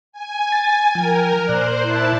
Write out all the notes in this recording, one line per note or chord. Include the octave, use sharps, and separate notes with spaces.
G#5
A6
F3 A#4 G5
A#2 C5 D5 F#6
E4 A5